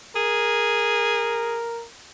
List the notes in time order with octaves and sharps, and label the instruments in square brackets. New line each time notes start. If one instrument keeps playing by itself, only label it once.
[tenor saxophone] G#4 [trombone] A#4